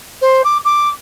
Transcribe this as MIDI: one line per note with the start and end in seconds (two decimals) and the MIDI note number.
0.21 0.41 72
0.44 0.57 86
0.64 0.88 86